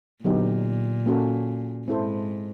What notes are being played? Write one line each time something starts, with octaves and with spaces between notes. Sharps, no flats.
A#2 D3 F#3 B3 D#4 G4
A#3 C#4 F#4 A4
G#2 C4 E4 A4 C5